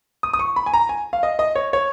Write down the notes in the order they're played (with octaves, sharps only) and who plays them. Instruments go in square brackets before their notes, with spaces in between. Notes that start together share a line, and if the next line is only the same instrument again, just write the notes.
[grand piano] D#6
D#6
C#6
B5
G#5
A#5
G#5
F5
D#5
D#5
C#5
C#5